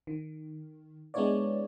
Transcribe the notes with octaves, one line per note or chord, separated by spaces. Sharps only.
D#3
G#3 B3 D4 E4 C#5 D5